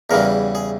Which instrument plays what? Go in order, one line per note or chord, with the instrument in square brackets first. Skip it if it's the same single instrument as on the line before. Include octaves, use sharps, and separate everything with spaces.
[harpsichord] E2 C#3 E3 G3 A#4
G#4